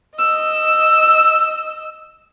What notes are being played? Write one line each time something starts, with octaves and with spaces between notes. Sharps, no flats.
D#5 E6